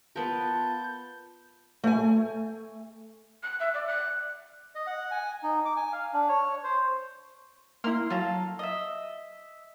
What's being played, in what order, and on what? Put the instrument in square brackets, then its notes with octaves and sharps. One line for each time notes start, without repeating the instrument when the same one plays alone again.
[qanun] B3 A#4 [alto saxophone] F4 [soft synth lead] A5 [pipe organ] G6
[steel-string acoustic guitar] A3 G#5
[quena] F#6
E5
D5
F#6
[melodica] D#5
F#5
G#5
D#4
D6
G#5
F5
D4
C#5
C5
[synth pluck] A#3 E4 [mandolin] A#5 C6 F6
[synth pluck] F#3 [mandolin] F4 A4 A#5
[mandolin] D#5 E5